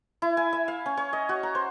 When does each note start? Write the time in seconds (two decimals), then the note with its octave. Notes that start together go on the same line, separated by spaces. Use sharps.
0.22 E4
0.37 G#5
0.53 E5
0.68 F5
0.86 C#4
0.97 C#5
1.13 D#5
1.29 F#4
1.43 A#5
1.55 C5